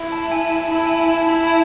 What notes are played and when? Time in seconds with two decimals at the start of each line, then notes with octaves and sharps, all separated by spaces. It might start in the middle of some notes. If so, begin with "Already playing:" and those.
Already playing: E4
0.12 A5
0.32 G#5
0.51 A5
0.70 E4 A5
0.86 G#5
1.00 G#5
1.14 A5
1.29 E4 B5
1.44 A5